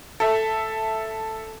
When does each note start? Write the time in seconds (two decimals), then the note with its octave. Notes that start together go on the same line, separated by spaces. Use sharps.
0.20 A4 E5